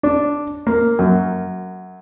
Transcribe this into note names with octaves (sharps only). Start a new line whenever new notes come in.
D4
A#3
F#2